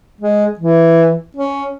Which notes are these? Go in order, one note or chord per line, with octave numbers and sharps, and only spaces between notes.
G#3
E3
C#4